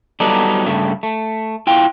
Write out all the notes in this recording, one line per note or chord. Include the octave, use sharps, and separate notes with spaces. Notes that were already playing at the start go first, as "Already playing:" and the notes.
F#3 G3 B3 D#4 A4 D5
G2 C#3 A3
A3
E4 F4 G5